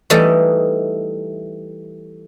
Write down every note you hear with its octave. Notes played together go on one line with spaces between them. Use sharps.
E3 G3 A3 D#4